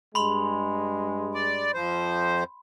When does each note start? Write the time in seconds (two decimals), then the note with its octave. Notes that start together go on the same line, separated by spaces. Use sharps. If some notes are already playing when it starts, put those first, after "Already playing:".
0.15 G2 G#3 B5 C6 F7
1.34 D5
1.74 F2 F3 C5